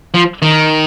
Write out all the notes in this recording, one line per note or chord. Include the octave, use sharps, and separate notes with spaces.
F3
D#3